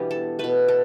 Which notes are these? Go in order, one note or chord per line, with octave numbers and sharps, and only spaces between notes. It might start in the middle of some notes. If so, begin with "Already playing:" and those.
Already playing: B2 E3 G3 B3 D4 G4
A4
B2 A3 B4
A4